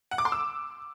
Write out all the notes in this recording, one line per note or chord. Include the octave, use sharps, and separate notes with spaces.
F#5
D6
C6
E6